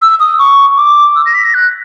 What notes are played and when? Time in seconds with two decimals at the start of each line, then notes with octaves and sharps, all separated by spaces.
0.02 E6
0.20 D#6
0.39 C#6
0.77 D6
1.16 E6
1.26 A#6
1.34 B6
1.44 A#6
1.54 F#6